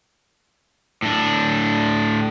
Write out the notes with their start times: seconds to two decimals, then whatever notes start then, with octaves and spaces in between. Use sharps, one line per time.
1.02 A2 D4